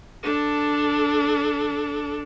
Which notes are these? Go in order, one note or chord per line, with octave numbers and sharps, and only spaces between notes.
D4 A4